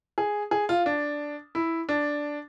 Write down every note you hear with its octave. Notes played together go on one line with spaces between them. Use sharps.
G#4
G#4
F4
D4
E4
D4